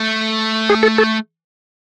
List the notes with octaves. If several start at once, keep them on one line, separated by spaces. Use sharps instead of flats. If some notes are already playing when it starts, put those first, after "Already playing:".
Already playing: A3
G#4
A4
A4